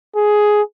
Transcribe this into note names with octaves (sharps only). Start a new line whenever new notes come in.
G#4